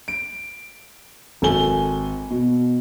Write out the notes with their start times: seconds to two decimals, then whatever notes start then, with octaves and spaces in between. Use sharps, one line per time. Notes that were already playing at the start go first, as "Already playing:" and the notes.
0.08 D7
1.42 G#1 A4 G#5 G7
2.31 B2